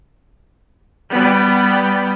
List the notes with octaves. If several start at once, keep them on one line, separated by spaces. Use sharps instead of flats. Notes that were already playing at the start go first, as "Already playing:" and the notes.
G3 B3